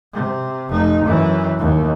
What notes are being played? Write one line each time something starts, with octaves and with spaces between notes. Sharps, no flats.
C3
F1 D#4
F#2 E3
D#2